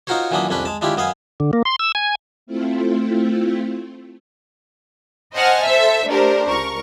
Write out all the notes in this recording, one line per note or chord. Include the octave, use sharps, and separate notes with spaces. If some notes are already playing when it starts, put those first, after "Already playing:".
D#4 F4 F#4 A#4 C5 C#5
A#2 E3 F#3 C#4 D4 D#6
C2 F2 C#4 D4 B4
G#3 A5
G#3 D4 E4 F4 G4
F#2 B3 D#5 F5 G#5
D3
A#3
C6
E6
G#5
A3 C4 E4 F4
C5 D#5 F#5 G#5 A5 F6
A4 C5 E5
A3 D4 G4 A#4 C5
C#2 A#4 C#6